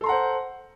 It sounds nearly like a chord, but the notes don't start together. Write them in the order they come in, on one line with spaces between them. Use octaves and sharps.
A4 C6 A#5 F#5 C5